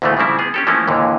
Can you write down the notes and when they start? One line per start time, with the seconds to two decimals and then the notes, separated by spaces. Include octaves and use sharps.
0.02 D2 A#2 E3 G#3 A3 B3
0.17 C#3 F3 G3 C4 E4
0.39 B3 G#4
0.54 C#4 G4 A4
0.67 E3 F3 A3 A#3 C#4 E4
0.87 D#2 A#2 D3 E3